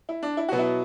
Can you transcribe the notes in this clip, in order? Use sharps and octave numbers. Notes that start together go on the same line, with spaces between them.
E4
D4
E4
B2 F#3 B3 F#4
E4